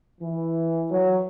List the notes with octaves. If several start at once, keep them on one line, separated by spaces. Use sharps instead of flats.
E3
F#3